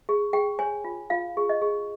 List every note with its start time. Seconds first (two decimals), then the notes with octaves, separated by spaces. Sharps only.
0.09 G#4
0.33 G#4 G5
0.59 C#5 G#5
0.84 F4
1.10 F4 F5
1.37 G#4
1.49 D#5
1.62 G#4